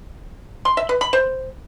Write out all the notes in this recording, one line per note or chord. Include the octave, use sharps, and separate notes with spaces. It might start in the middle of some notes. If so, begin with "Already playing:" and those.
C6
E5
B4
B5
C5